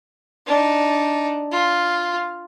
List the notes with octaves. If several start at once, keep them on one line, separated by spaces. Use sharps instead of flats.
D4 D#4
F4